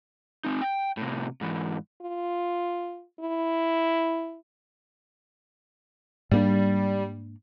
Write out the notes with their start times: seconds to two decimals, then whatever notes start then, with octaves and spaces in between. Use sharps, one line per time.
0.44 C4 D#4
0.61 G5
0.97 A2 C3
1.41 G#2 E3
2.01 F4
3.20 E4
6.31 G#2 G3 A#3 D4